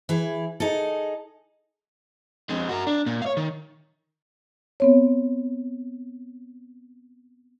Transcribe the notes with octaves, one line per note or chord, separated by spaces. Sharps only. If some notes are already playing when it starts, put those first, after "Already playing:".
E3 G#4
D#4 G#4 A4
F2 G#3
F#4 A#4
D4
A#2
C#5 F5
D#3
B3 C4 C#5